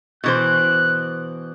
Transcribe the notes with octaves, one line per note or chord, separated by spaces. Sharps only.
B2 E3 C5 F#6